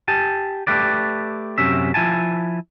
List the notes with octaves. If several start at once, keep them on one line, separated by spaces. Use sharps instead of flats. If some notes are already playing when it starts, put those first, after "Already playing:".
G4 G#5 A5
A3 G4 B4 D5
F#2 C3 C#4 E5
F3 E4 G#5 A5